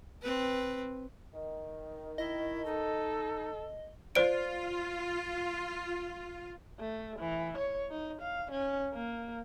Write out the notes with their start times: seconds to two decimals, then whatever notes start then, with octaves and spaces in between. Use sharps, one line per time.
0.22 C4 B4
1.33 D#3
2.18 E4 D#5
2.66 D#4 A4
4.15 F4 C5 D5 D7
6.80 A3
7.19 E3
7.57 C#5
7.90 D#4
8.22 F5
8.51 C#4
8.94 A#3